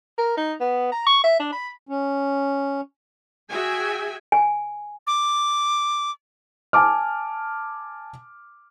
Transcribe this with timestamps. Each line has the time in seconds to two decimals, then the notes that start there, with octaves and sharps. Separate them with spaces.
0.18 A#4
0.37 D#4
0.60 B3
0.92 A#5
1.06 C#6
1.24 E5
1.40 D4
1.52 B5
1.89 C#4
3.49 F#4 G#4 E5 G5 G#5
4.32 G#5
5.07 D6
6.73 G#5 A5 D6 F6